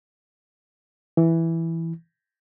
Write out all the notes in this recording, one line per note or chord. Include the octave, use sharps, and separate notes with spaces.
E3